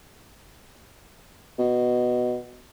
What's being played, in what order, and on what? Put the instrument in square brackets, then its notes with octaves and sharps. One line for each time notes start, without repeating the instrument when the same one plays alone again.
[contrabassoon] B2